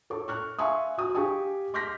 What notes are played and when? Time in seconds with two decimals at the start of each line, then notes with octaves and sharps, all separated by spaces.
0.10 A4 C#5 D6
0.28 C#6 F6 F#6
0.59 E5 F5 G#5 C6 C#6 D#6
0.98 F#4 D#6
1.15 G4 F5 G#5 C#6 D#6
1.74 C6 D6 F6 G6 A#6 B6